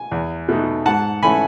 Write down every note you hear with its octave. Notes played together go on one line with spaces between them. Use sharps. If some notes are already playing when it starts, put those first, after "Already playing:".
Already playing: G#5
E2
B2 A3 D#4
G#2 F#5 A5
E3 A3 C#4 G#5 B5